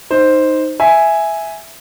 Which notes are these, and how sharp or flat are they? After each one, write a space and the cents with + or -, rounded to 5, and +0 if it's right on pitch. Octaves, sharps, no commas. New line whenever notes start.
D#4 +0 C5 +0
E5 +0 G#5 +0